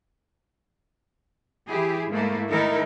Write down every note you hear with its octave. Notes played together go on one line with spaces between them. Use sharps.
E3 E4 G4 G#4
G#2 A3 A#3 E4
D#3 A3 D#4 E4 A4 A#4